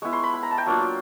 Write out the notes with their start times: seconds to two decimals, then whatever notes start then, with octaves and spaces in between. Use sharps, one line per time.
0.02 G#3 B3 E4 C#6
0.13 C6
0.23 B5
0.34 B5
0.43 A#5
0.51 A5
0.58 G5
0.66 F#3 A#3 D4 F4